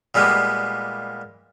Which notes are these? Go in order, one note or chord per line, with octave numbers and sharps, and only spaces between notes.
A#2 G3 G#3 A#3 B3